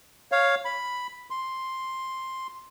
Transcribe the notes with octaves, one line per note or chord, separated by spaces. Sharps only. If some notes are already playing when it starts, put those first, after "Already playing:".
C#5 F5
B5
C6